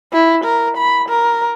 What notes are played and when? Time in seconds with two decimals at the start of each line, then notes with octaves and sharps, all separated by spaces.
0.12 E4
0.44 A#4
0.77 B5
1.09 A#4